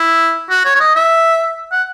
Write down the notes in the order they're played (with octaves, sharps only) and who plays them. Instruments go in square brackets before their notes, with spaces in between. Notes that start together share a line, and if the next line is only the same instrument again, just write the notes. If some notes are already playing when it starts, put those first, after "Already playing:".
Already playing: [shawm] E4
F#4
C#5
C#5
D#5
E5
F#5